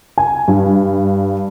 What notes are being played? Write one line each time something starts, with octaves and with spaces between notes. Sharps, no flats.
G#5
G2